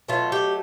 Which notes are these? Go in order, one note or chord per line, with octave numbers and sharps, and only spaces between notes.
B2 F#3 A3 F4
G4